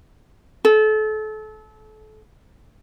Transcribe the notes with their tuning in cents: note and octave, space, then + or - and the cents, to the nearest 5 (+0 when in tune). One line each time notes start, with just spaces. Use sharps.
A4 -30